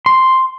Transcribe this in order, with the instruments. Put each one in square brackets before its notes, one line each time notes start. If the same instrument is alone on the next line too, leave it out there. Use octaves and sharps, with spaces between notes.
[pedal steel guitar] C6